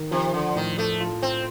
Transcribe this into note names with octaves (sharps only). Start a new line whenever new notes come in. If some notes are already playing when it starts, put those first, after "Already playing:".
Already playing: D#3
C3 F3
D3
A2 D#3
A3
F4
C4